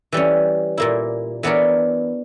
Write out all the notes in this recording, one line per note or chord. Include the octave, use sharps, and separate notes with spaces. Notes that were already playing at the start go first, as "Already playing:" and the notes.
E3 G3 C#4
A#2 A#3 E4
E3 B3 D4 A#4 C#5